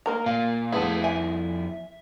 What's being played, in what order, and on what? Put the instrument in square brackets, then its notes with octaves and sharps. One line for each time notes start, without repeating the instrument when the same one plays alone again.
[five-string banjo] A#3 A#4 A#5
[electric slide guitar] A#2 [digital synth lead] F5
[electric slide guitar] F2 E4 [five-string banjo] A3 B3 G#4
[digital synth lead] E5 [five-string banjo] G#5